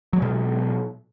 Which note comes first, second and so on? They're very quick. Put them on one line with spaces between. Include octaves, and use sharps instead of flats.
F#3 G#3 B2